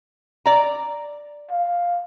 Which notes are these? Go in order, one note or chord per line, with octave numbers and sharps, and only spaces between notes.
D5 A#5
F5